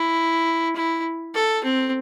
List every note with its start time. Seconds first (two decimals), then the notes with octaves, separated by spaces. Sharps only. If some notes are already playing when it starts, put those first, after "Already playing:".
Already playing: E4
0.76 E4
1.34 A4
1.64 C4